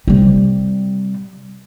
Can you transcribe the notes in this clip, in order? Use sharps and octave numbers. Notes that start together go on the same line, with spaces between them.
C3 G3